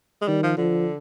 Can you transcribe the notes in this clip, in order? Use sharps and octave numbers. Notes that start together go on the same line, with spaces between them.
G#3
D#3 G3
F3
D3 F3